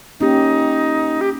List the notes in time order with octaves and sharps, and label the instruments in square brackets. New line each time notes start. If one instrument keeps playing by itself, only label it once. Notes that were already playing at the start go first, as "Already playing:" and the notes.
[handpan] A#3 C#4 G4 [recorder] D#4
[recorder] G4